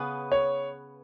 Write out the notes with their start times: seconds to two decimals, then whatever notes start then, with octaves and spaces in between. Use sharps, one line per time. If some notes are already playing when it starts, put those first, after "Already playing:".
Already playing: C#3 B3 G#4 B4
0.32 C#5